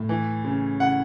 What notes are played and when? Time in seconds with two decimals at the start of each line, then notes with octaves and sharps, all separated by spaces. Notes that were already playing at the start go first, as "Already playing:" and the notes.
Already playing: A2
0.09 E3
0.45 C#3
0.80 C#3 F#5